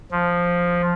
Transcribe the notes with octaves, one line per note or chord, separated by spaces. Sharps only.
F3